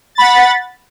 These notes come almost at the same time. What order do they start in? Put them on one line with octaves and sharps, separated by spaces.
A6 B5 F#5